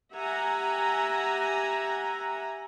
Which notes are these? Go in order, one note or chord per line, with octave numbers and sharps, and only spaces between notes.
G4 E5 F#5 G#5 A#5